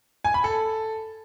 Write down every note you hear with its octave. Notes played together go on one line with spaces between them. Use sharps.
G#5
B5
A4